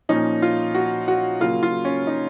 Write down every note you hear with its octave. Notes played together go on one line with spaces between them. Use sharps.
A#2 F3 A#3 C#4 D#4
F4
F#4
F#4
C#3 F#3 A#3 F4
F4
C#4
D#4